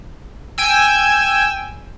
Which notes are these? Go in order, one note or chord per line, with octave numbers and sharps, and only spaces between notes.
G5 G#5 E6